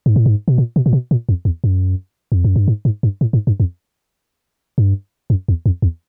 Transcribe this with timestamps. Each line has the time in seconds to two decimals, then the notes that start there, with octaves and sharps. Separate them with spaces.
0.06 G#2
0.16 A2
0.26 G#2
0.48 B2
0.58 A#2
0.76 B2
0.86 A#2
0.93 B2
1.11 A#2
1.29 F2
1.45 E2
1.64 F#2
2.32 F2
2.45 F#2
2.56 G2
2.68 G#2
2.85 G#2
3.03 G2
3.21 A2
3.33 G#2
3.47 G2
3.60 F2
4.78 G2
5.30 F#2
5.48 E2
5.66 F2
5.82 E2